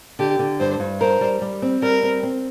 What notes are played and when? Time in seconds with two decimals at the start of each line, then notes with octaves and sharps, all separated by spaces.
0.19 D3 G4
0.39 D3
0.60 G2 C5
0.80 G2
1.00 A#4 C5
1.21 G3
1.42 G3
1.62 C4
1.82 G3 A#4
2.03 C4
2.23 C4